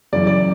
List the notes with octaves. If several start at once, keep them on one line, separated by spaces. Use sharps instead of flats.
F#2 C#3 E3 D5
D5